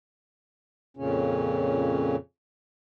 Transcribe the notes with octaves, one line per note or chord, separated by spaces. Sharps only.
F2 A#2 C#3 C#4